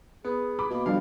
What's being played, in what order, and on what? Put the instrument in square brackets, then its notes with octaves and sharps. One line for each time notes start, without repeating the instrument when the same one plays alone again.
[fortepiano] B3 [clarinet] G#4
[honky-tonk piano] B5 D6
[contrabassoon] B2 [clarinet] A#3
[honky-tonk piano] D3 F3 G3 [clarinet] G#3 [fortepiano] F5